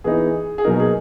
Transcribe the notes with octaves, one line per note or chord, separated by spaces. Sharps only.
E3 B3 D#4 G#4
G#4
B2 F#3 A#3 D#4 A#4
G#4